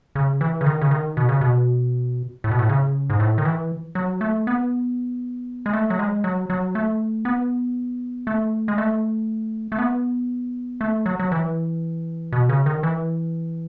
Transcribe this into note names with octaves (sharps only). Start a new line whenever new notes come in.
C#3
E3
C#3
D#3
C#3
D#3
B2
C#3
B2
A2
B2
A2
C#3
G#2
A2
D#3
E3
F#3
A3
B3
G#3
A3
F#3
G#3
F#3
F#3
A3
B3
A3
G#3
A3
A3
B3
A3
F#3
F#3
E3
B2
C#3
D#3
E3